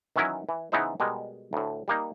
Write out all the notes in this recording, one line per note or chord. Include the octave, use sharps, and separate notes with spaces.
D#3 E3 F#3 C#4 E4 A#4
E3
C#3 E3 B3 D#4 E4 C5
B2 G3 G#3 A#4
D2 A2
G3 A#3 D#4